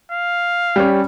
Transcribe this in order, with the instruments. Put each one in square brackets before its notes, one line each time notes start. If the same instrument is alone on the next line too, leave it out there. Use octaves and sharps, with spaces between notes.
[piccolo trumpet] F5
[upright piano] G3 C#4